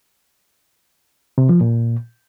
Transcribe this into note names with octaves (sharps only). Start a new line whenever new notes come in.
C3
F3
A#2